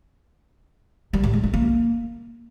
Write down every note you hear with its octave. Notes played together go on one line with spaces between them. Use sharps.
G3
A2
G#3
A3
A#3